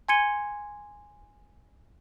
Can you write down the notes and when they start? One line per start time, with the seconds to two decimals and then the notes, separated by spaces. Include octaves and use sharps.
0.08 G#5 C6 G#6 C#7 D#7 G7